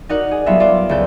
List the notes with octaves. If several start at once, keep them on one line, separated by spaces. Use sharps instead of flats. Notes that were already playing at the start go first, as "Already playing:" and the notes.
D#4 F#4 A#4 D5 F#5
G#4
F#3 G3 B3 D#4 F4 E5
F4 D5
C#2 E4 A4 G6